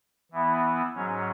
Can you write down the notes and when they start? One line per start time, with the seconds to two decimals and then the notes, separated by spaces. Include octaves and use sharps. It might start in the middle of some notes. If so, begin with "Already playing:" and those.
0.32 E3 B3 E4
0.95 G#2 F#3 C#4